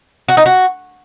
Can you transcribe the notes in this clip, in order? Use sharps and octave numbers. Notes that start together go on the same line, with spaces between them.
F#4
D#4
F#4